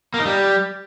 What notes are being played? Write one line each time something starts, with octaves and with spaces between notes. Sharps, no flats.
A#3
D#4
G3